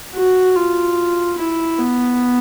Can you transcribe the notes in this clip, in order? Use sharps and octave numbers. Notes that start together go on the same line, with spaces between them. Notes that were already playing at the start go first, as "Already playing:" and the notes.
F#4
F4
E4
B3